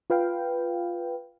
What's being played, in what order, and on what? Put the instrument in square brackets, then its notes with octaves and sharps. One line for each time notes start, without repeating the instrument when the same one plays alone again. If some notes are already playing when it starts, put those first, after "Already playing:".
[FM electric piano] F4 B4 F5 G5